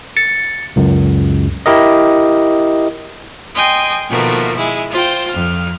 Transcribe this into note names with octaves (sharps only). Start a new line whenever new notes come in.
A6 C#7
C#2 F#2
E4 G4 A#4 D#5
D#5 G5 G#5 C6
B2 D#3 F3 A3 A#3
G#3 E4
F4 C5 G5
F2 F6